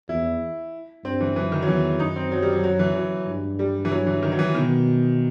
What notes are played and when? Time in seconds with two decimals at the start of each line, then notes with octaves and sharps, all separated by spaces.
0.09 E2 E4
1.04 G2 C4
1.20 E3
1.36 F#2 E3
1.52 D#3
1.62 F#3
1.67 E2 E3
1.99 F#2 D#4
2.16 C4
2.32 F#3
2.42 G3
2.53 F#3
2.64 F#3
2.79 E3
2.95 F#3
3.27 G2
3.59 G3
3.85 E3
3.91 F#3
4.07 E3
4.22 D#3
4.32 F#3
4.39 E3
4.54 B2 D#3